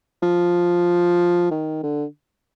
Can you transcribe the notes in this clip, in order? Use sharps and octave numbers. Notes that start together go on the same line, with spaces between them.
F3
D#3
D3